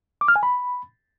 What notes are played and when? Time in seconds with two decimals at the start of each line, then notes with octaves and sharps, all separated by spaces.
0.21 D6
0.28 F6
0.36 G#5
0.43 B5